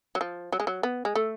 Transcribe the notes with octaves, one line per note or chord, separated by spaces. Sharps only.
F#3
F3
F#3
G#3
F#3
B3
G#3
A3